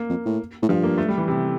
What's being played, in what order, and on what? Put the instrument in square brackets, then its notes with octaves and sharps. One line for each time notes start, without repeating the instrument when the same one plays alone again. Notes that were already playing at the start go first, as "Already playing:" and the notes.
Already playing: [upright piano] A#3
[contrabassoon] F2
A2
A2
[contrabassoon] G2 [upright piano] F3
[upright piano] A#3
A3
G3
E3
C3